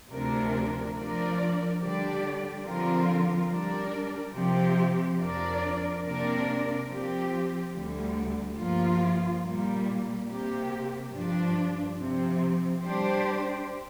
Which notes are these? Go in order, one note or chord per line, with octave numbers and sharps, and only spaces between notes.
D2 C3 F3 D4 A#4
F3 D4 A#4 D5
D3 G3 D4 G4 D5
D3 F3 C4 F4 A#4
G3 D4 A#4 D5
C3 F3 C4 G4
F2 F3 D4 A#4 D5
C3 A#3 D4 A#4 D5
F3 C4 G4
D2 D3 G3
G2 F3 A#3 F4
A#2 G3 A#3
C3 A#3 G4
G2 F3 D4
C3 F3 C4
G3 D4 G4 C5